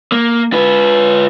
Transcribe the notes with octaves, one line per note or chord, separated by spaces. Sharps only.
A#3
F4 B4